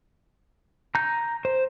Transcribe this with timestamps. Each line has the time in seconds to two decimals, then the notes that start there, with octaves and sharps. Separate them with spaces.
0.95 A#5 G6
1.45 C5